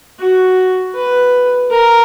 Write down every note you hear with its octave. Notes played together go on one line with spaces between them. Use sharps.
F#4
B4
A#4